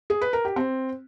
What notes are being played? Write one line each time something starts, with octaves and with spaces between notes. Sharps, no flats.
G#4
B4
A#4
G4
C4